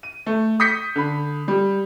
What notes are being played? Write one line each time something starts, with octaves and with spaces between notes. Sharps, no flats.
D#7
A3
D#6 G6 B6 C#7
D3 B5
G3